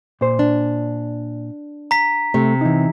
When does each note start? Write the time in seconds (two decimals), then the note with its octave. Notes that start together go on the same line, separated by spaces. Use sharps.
0.21 A#2 C5
0.39 D4
1.91 A#5 B6
2.34 C3 A3
2.61 E3 D#4